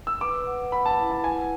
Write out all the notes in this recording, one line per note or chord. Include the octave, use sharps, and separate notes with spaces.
E6
B4 D6
F#5
F#5 B5
A5
E4
A5
F#5 G#5